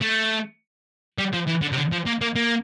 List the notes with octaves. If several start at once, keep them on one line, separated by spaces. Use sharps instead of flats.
A3
G3
F3
E3
D3
C3
D3
F3
A#3
A#3
A#3